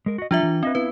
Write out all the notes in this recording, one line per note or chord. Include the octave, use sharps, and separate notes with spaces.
G#3 A#4
F#4 D#5
F3 G3 D4 F4 E5
E3
C4 B4 D#5 E5
B3 E4 B4